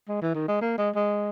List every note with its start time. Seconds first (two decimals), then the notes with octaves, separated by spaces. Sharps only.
0.09 G#3
0.22 E3
0.35 D#3
0.48 G#3
0.61 A#3
0.78 G#3
0.95 G#3